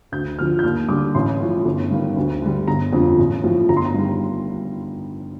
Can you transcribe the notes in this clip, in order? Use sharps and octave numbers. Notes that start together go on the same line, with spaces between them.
D2 G6
D3 F3 F6
G6
D#2 F6
D3 G3 D6
A1 C6
A2 F3
G1
G2 D#3
D2
D3 G3
G1 A#5
F2 D3 F3
A1
A2 F3
G1 A#5
C6
A#5
G2 D#3 G3